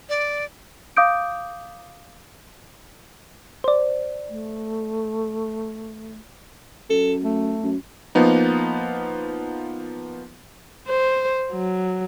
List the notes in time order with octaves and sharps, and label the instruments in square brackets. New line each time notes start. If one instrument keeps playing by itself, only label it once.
[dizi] D5
[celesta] F5 D6 D#6 G6 D7
[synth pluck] C5 D5
[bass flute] A3
[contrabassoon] F#2 [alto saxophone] A4
[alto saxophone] A3
[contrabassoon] F#2
[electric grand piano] F3 A#3 B3 D#4
[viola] C5
F#3